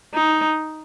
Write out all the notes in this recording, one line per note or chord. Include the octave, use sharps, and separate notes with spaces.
D#4